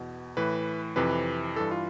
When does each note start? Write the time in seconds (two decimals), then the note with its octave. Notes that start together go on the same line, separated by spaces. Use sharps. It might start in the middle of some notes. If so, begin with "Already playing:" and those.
Already playing: E2 B2
0.37 A2 E3 B4
0.96 F2 C3 E3 B4
1.56 G2 E3 A4
1.71 F4